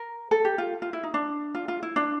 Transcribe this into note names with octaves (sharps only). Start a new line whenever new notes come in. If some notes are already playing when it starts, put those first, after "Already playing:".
Already playing: A#4
A4
G4
F4
F4
E4
D#4
D4
F4
F4
E4
D4